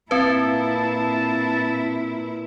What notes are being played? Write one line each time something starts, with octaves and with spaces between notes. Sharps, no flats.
A#2 C4 E4 B4 A5